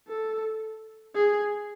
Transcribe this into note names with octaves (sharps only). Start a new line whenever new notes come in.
A4
G#4